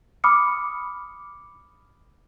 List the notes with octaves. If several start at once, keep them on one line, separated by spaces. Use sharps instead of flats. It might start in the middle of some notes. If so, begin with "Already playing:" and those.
B5 D6 D#6 F6 C#7